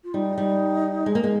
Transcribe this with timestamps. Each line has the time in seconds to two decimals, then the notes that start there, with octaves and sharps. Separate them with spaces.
0.04 F4
0.14 G3 D#4
0.38 G3
1.06 G#3
1.15 A#3
1.24 G#3